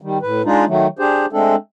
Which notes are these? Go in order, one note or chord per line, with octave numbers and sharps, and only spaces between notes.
D#3 G3
A2 B4
G#3 D4 D#4 F4
D#3 F#3 A3
D4 G4 G#4 C5
G#3 A3 C4 D4 A4